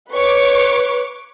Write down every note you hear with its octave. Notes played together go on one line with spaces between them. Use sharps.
B4 C#5 C#6 D6